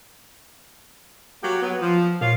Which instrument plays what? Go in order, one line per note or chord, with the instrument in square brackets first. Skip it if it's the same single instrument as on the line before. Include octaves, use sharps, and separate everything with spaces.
[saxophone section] F#3 A#3 G4
F#3 B3
F3
[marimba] A#2 [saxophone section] F4 C#5 F5